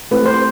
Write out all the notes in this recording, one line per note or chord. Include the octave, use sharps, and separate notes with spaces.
A3 C4 E4 G4 B4
C5